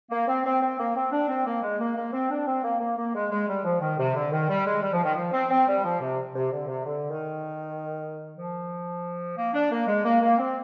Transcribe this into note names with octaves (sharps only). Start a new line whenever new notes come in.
A#3
C4
C4
C4
A#3
C4
D4
C4
A#3
G#3
A#3
A#3
C4
D4
C4
A#3
A#3
A#3
G#3
G#3
G3
F3
D#3
C3
D3
D#3
G3
G#3
G3
F3
D#3
F3
C4
C4
G3
F3
C3
C3
D3
C3
D3
D#3
F3
A#3
D4
A#3
G#3
A#3
A#3
C4